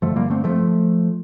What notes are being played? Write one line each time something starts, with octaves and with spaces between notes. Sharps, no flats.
G2 D3 F3 A3
G3 A#3
A3 C4
F3 A3